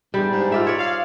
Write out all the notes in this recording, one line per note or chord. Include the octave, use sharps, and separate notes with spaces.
E2 G2 G3 G#3
G#2
F4 D5 E5
C#5 D5
F5